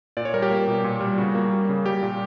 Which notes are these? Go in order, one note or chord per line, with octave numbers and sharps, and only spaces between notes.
A#2 D5
C#5
G3 A#4
G4
A#3
B2
A#2
G3
C#3 F#4
A#3
G3
C#3
G3 G4
A#2